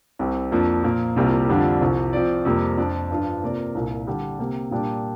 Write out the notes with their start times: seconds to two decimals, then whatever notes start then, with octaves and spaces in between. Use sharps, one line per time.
0.19 C2 C3 G3 C4
0.52 F2 F3 A#3 D4
0.84 A#2 F3 A#3
1.16 C2 C3 G3 A#3 F4
1.49 F2 D3 G3 D4 F4
1.81 C2 C3 F3
2.13 F3 C4 F4 D5
2.45 F2 C3 G3 A#3
2.77 F2 F3 D4 F4 D5
3.11 G2 F3 D4 F4
3.43 C3 A#3 F4 A#4 D5
3.75 C2 A#2 A#3
4.07 D3 G3 D4
4.39 C3 A#3 G4
4.71 A#2 G3 A#3 D4 G4